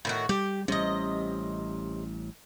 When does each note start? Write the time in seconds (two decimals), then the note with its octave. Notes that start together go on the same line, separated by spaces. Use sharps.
0.05 A2 D#3 F#4
0.29 G3 G4
0.68 A1 C3 G3 C#4 D#5